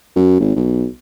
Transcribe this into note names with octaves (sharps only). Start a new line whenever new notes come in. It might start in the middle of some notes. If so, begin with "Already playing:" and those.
F#2
G#1
B1